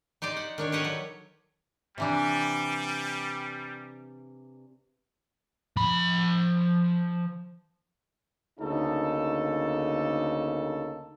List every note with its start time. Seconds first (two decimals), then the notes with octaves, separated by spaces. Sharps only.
0.22 D#4 G4 C5 D5
0.37 F#5
0.58 D#3 D4 C#5
0.72 G4 A4 B4 C#5 D#5 F#5
0.85 F#3
1.98 C3 E3 G3 D4
5.77 F3 B5
8.60 D2 C#3 A#3 D#4 A4 A5